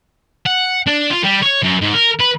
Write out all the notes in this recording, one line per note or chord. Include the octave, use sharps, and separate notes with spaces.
F#5
D4
F4
G3
C#5
F#2
G#2
A#4
B4